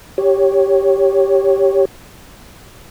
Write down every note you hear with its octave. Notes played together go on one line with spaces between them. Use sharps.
G4 C#5